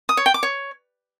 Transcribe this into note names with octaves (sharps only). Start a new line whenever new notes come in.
D#6
C#5
G5
D6
C#5